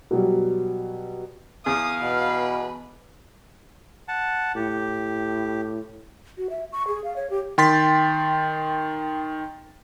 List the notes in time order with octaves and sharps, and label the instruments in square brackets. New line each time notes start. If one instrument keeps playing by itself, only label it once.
[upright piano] B2 F#3 G3
[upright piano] E2 [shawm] F5 [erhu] D#6
[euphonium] B2 [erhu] B4
[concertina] F#5 A5
[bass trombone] A2 [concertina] G4
[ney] F#4
E5
C#6
G#4
F5
C#5
G4
[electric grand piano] D#3 G5 C6 A6 B6